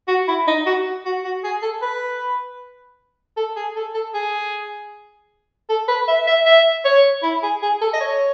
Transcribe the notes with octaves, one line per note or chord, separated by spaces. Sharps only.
F#4
E4
D#4
F#4
F#4
F#4
G#4
A4
B4
A4
G#4
A4
A4
G#4
A4
B4
E5
E5
E5
C#5
E4
G#4
G#4
A4
D#5
C#5